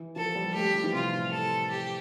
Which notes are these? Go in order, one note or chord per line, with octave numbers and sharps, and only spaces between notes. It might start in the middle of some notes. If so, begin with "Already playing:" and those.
Already playing: E3
F3 A4
G3
A3 G4
G3
F3
E3
C3 F4
A2
A4
G4